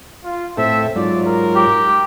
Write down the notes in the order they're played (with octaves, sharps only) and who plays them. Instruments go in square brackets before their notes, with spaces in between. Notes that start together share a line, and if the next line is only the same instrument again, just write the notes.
[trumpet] F4
[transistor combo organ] A2 C4 A4 [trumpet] E5
[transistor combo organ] G#2 F#3 F4 [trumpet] D5
[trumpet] A#4
[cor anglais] G4